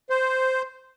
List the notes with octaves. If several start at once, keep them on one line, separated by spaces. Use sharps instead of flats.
C5